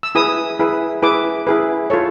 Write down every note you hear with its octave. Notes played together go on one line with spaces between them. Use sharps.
E6
E4 G#4 B4 D#6
E4 G#4 B4
E4 G#4 B4 D6
E4 G#4 B4
F4 A4 C#5